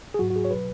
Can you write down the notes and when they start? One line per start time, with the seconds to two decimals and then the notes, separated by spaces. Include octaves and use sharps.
0.14 G#4
0.19 G#2 F#3 F#4
0.30 F#4
0.36 G#4
0.45 C#5
0.51 B2 F#3 B4